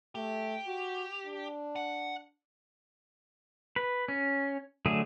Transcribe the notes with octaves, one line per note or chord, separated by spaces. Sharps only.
A3 G4
F#4
D4
F#5
B4
C#4
D3 F#3 A3 G#4